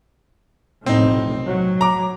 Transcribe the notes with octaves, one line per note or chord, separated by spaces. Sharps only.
F1 B1 A2 C4 D#4
F#3
A#5 D6